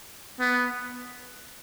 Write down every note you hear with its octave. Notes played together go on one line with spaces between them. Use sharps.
B3